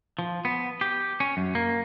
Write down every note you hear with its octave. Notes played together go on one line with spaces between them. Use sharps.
F3
B3
G4
C#4
F#2
A#3